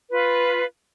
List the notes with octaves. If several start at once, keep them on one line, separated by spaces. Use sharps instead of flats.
F4 B4